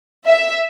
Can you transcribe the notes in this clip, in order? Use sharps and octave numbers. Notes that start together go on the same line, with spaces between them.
E5